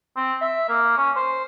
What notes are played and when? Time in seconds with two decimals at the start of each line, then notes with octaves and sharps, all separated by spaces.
0.17 C4
0.42 E5
0.69 A#3
0.97 C#4
1.16 C5